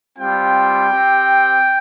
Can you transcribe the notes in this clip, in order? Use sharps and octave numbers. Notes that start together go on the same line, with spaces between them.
G3 C4 F4 G5
C4 G4